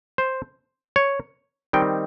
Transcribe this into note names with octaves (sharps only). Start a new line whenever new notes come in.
C5
C#5
D#3 G3 C4 D#4 G5